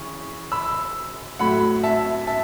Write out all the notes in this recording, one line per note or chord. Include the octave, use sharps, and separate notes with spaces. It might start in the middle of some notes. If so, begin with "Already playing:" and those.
Already playing: C#3 E3 C#6
B5 E6
A2 F#3 A3 F#5 B5
E5 A5
E5 A5